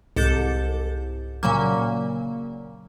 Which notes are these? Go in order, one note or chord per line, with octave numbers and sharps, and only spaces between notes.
C2 G#2 A4 D6 G6 A6
A#2 C#3 F#3 A#3